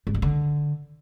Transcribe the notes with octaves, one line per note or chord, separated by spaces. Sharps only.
G#2
G2
D3